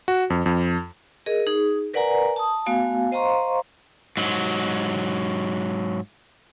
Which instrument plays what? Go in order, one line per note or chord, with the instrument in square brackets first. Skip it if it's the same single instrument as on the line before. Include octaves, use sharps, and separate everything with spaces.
[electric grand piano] F#4
F2
F2
[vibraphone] G#4 A#4 D#5
D#4 G#4
A#4 B4 D5 F#5 G#5 A#5
A5 D#6
A3 B3 F#4 F5 G#5
C5 D#5 F5 A#5 C6 C#6
[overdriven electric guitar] G#2 F#3